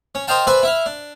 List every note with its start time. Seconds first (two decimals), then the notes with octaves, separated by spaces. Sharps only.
0.15 C#4
0.27 A#4 C5 D#5 F5 G5 A5
0.47 B4 C5 D5 E5 G#5
0.63 E4 E5 F5
0.86 D4